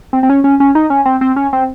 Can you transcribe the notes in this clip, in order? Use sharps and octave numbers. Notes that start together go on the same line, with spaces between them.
C4
C4
C#4
C#4
C#4
D#4
C#4
C4
C4
C#4
C4